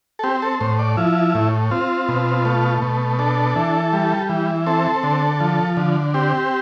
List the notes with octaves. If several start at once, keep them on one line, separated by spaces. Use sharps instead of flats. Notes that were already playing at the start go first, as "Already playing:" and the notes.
A4
C4 G4
A4
A2 C5
D5
F3 E4
A2
C4 F4
B2
A3
B2
D4 A4
E3
G3
E3
C4 A4
D3
F3
D3
C4 G4